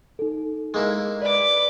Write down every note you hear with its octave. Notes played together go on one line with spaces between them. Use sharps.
D#4 A4
G#3 A#3 E4
B4 D5 D6